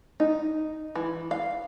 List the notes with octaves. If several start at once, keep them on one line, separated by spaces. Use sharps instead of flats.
D#4
E3
F5